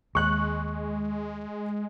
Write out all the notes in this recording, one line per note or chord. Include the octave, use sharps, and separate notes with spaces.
D#2 G#3 C#6 F#6